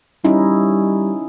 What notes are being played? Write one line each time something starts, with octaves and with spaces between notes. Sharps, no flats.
G3 C#4 D#4 E4